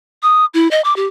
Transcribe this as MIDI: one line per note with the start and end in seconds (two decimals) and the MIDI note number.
0.23 0.45 87
0.54 0.70 64
0.71 0.81 75
0.84 0.96 86
0.96 1.07 67